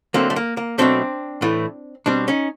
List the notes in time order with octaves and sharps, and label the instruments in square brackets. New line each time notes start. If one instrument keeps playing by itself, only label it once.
[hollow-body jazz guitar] D3 F#3 A3 A#3 C4
A3
A#3
A#3
B2 F#3 A3 C4 D4
A2 E3 A3
B2 G3 C4 D4
C#4 D#4